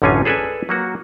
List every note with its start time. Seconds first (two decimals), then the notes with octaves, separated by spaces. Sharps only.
0.02 A1 F#2 D3 C#4 F4 G#5
0.25 G#4 A4 B4 D5 G#5
0.69 F#3 A#3 F#4